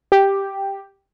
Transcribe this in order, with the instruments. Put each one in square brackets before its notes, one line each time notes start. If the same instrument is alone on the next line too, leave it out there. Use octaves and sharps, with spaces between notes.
[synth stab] G4